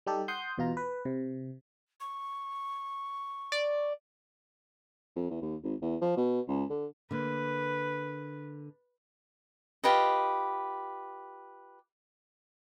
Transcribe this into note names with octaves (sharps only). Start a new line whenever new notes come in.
G3 D#4 G4 A4
F#5 C6 D#6 G6
E2 B2 F4 A#5
B4
C3
C#6
D5
F2
E2
D#2
G#1
E2
F3
B2
C#2
D3
D3 A#3 B4
F4 G4 B4 D#5